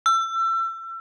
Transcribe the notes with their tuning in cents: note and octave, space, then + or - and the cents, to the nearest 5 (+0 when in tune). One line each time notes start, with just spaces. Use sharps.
E6 +30